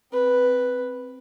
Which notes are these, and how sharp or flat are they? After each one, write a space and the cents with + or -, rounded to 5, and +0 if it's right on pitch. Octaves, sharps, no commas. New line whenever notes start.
C4 +0 B4 +0